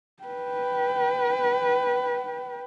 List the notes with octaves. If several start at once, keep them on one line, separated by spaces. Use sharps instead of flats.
B4 G5